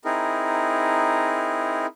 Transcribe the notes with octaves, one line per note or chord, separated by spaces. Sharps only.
C4 D#4 E4 G#4 A#4